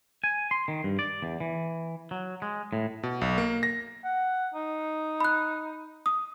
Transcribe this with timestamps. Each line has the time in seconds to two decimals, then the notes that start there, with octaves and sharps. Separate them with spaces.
0.24 G#5
0.51 C6
0.68 D#3
0.84 G2
0.99 D5
1.22 E2
1.40 E3
2.11 F#3
2.42 G#3
2.73 A2
3.03 B2
3.21 B1
3.38 A#3
3.63 A#6
4.05 F#5
4.54 D#4
5.20 B5 F#6
6.06 D#6